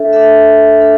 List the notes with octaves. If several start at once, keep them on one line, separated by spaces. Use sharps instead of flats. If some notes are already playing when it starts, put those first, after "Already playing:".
Already playing: D4 A4 E5
D4 A4 E5
D4 A4